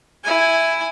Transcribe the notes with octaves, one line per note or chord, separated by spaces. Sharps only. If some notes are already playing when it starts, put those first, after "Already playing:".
E4 G#5